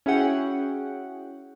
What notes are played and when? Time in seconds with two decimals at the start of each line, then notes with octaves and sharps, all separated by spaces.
0.06 C#4 E4 F#4 G#4 F#5 G5